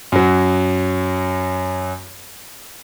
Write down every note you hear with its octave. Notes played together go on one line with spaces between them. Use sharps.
F#2 F#3